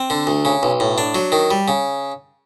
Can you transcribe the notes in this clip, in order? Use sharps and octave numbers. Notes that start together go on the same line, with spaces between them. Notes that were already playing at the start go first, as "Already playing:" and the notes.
Already playing: C4
D3
D2
C#3
B1
A2
D4
F#3
D#3
G3
C#3